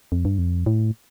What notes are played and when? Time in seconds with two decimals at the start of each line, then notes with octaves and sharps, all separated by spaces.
0.12 F2
0.25 G2
0.38 F2
0.66 A2